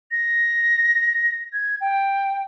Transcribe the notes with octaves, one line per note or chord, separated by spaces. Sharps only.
A#6
G#6
G5